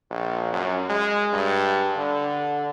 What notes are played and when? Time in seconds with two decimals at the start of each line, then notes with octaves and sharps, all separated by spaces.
0.10 A#1
0.53 F#2
0.89 G#3
1.33 G2
1.97 D3